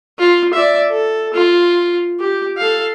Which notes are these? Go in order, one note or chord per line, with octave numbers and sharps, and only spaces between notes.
F4
D5 E5
A4
F4
G4
A4 F5